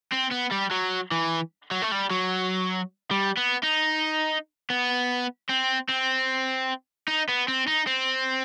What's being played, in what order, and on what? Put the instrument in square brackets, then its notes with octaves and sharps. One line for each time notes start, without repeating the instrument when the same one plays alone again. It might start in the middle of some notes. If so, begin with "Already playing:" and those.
[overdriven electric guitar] C4
B3
G3
F#3
E3
F#3
A3
G3
F#3
G3
B3
D#4
B3
C4
C4
D#4
B3
C4
D#4
C4